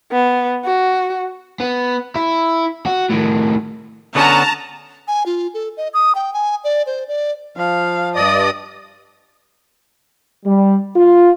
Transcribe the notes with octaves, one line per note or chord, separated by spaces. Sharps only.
B3
F#4
B3
E4
F#4
A2 D#3
D3 B3 C#4 A5 A#5
G#5
F4
A4
D#5
D#6
G5
G#5
D5
C5
D5
F3 F5
G2 D5 D#5 D#6
G3
F4